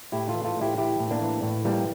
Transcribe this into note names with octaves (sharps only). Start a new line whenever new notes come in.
A2 E4 G4
F4 A4
E3
F4 A4
A2
E4 G4
E3 E4 G4
A2
A#3 D4
E3
A2
E3 G3 A#3